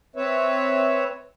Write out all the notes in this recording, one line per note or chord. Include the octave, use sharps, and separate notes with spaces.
C4 B4 C#5 E5